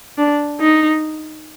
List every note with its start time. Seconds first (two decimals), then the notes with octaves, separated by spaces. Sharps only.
0.18 D4
0.61 D#4